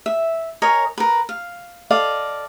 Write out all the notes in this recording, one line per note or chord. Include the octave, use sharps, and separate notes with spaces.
E5
A#4 C#5 D#5 G#5
A#4 B4
F5
A4 D5 D#5 F5